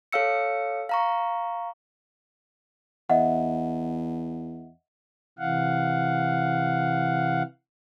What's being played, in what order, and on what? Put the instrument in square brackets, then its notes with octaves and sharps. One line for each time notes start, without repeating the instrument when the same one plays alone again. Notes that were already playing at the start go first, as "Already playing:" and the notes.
[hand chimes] A4 C#5 F5 E6 C#7
F5 A#5 C#6
[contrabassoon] E2 [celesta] D#5 E5 F#5
[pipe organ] C3 E3 F5 F#5